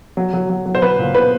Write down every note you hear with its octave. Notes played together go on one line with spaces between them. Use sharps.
F#3
F#3
F#3
F#3
C5
F#3 B4
A#2
B3 B4